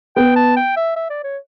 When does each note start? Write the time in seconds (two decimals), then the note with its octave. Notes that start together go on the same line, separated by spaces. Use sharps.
0.16 B3 G5
0.36 A5
0.57 G5
0.76 E5
0.96 E5
1.10 D5
1.24 C#5